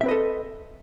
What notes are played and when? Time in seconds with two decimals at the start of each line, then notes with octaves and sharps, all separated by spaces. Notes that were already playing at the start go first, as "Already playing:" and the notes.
0.01 E5
0.03 C4
0.06 B4
0.08 D#5
0.11 A4